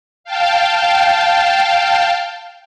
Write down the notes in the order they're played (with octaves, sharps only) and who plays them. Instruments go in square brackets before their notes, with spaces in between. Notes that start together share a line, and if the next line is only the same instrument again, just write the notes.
[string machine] F5 G5 A5